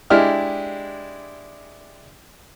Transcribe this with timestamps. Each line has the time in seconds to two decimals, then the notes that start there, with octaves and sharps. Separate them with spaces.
0.10 G#3 D4 E4 G4 F6